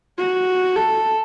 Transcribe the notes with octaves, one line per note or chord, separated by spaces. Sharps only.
F#4
A4